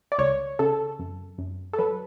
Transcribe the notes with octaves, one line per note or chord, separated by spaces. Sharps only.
D5
C#2 C#5
C#3 A4
F#2
F#2
A4
F#3 B4